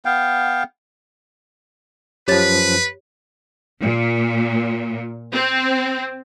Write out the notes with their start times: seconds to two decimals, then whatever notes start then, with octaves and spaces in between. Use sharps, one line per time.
0.05 B3 F5 G5
2.28 F#2 F3 G4 B4 C#5 A6
3.81 A#2
5.33 C4